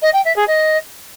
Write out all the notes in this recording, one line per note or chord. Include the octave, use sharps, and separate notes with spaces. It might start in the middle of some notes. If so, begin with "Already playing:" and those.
D#5
G5
E5
G#4
D#5